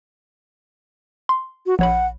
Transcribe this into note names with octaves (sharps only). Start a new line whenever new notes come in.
C6
F#4
A#1 C#5 F#5 B5